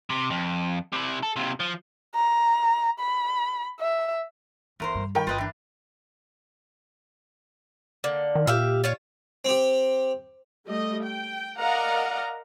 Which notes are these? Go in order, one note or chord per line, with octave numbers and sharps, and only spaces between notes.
C3
F2
C3 E4
A4
D#2 C3
F3
A#5
B5
E5
G1 E2 A#4 C5
G2
D#3 A#4 G5 B5
G1 F4 B4 D#5
E3 D4
D3 A#3
D#3
A#2 G4 E5 F5
F4 C#5 F5
C4 G4
G3 A3 D#5
G5
A#4 D5 D#5 F5 F#5 A#5